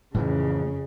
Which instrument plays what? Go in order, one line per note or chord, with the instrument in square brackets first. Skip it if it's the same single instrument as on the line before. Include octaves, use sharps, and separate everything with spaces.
[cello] F2 C#3 [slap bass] A2 E3 F3